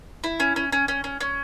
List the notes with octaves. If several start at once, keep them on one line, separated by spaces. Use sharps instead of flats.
E4
C#4
C#4
C#4
C#4
C#4
C#4